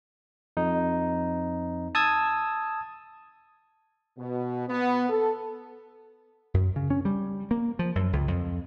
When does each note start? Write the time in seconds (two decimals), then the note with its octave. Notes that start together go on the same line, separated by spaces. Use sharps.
0.57 F2 D#4
1.95 A5 D#6 E6 G#6
4.18 B2
4.68 B3
5.10 A4
6.54 F#2
6.76 C#3
6.90 C#4
7.05 G3
7.51 A#3
7.79 F3
7.95 F#2
8.13 C#2
8.28 F2